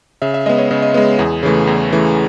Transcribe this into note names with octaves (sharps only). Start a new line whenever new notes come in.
C#3 E5
E5
G#3 B3 D#5
C#5
C#3 D#5
D#5
G#3 B3
E2 G#4
C#3 E3 A3
E2
C#3 E3 A3